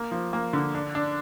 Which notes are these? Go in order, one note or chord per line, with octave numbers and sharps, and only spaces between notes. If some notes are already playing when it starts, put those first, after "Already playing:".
Already playing: A#3
F3
A#3
D3
D4
D4